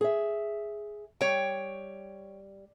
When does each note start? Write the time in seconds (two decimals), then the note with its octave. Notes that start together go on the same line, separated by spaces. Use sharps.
0.01 G#4 E5
1.21 G3 C#5 G5